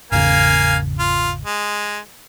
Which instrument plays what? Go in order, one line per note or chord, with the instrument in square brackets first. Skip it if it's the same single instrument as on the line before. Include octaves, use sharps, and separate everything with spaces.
[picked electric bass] G#1 E2 C#3 [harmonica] A#3 F5 G#5
[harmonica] F4
G#3